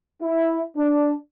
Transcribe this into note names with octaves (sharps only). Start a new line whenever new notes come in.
E4
D4